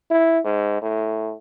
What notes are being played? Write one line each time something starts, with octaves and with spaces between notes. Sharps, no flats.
E4
G#2
A2